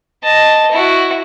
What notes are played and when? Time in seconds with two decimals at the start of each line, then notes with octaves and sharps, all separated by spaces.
0.23 D#5 A5
0.71 E4 F#4